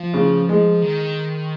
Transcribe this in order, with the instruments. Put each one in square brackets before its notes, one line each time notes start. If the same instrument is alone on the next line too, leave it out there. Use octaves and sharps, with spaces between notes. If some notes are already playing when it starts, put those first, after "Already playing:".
Already playing: [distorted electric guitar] F3
[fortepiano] C#3
G#3
[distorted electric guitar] D#3